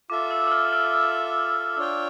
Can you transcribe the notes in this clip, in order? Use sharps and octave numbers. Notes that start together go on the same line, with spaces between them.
F4 A4 E5 D6
E6
E6
F6
F6
F6
D4 F4 C#5 G5